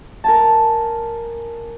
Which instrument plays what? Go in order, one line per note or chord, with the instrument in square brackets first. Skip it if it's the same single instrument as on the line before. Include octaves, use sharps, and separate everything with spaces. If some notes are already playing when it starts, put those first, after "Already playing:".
[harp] A#4 G#5 A5